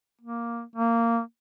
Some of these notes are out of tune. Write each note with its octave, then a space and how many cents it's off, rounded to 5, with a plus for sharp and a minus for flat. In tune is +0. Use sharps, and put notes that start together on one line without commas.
A#3 +5
A#3 -15